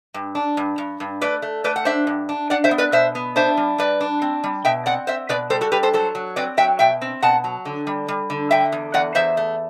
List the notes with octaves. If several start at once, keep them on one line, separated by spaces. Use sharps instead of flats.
G2
D4
G2
G2
G2
A3 B4 D5
A3
A3 B4 D5
F#5
D4 C5 E5
G2
D4
D4 D5 F#5
C5 E5
B3
B4 D5
B2 C5 E5
B3
D4 C5 E5
G3
G3 B4 D5
D4
C4
G3
B2 E5 G5
C4 D5 F#5
C4 C5 E5
B2 B4 D5
G3 A4 C5
F#4 A4
G3 G4 B4
A4 C5
F#3 A4 C5
F#3
C4 B4 D5
F#3 E5 G5
B2 E5 G5
C4
B2 F#5 A5
F#3
D3
G3
G3
D3
D3 E5 G5
E2
E2 D5 F#5
E2 C5 E5
A3